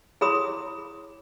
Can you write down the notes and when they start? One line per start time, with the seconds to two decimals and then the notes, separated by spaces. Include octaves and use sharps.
0.21 E4 G#4 C#5 B5 C6 D#6